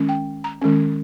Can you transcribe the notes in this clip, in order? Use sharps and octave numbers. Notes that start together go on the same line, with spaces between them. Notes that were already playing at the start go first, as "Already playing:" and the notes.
Already playing: D#3 G#3 C#4
G5
A#5
D#3 G#3 C#4